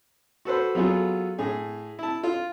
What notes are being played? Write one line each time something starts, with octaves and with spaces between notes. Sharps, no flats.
F#4 A4 B4 C5
F#3 B3 F4 G#4 A4
A2 G#4
E4 A5
F4